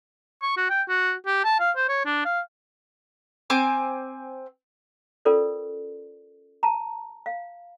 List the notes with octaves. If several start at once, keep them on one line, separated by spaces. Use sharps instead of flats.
C#6
F#4
G5
F#4
G4
A5
F5
C5
C#5
D4
F5
C4 G#5 D6
C#4 F4 A4 A#4 C5 D5
A5 A#5
F5